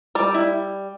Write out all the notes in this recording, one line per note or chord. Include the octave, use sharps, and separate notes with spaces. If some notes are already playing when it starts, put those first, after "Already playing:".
G3 D5
E4